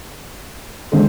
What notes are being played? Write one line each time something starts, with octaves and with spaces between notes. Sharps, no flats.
D3 G#3 C4